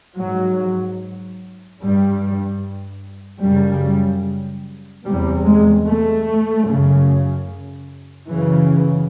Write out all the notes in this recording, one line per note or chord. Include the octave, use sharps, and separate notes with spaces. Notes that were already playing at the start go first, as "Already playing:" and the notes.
G#2 F#3
G2 G3
F#2 C#3 G3
E2 C3 G3
G#3
A3
F#2 C#3
F#2 C#3 E3